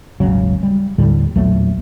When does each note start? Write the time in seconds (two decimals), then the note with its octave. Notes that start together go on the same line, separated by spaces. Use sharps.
0.20 D#1 G#1 C#3 F#3
0.63 G3
0.98 D#2 A2 D3 G3
1.36 A#1 E2 F#3 A3